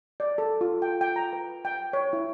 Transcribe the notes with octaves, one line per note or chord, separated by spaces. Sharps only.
D5
A4
F4
G5
G5
A#5
B4
G5
C#5
E4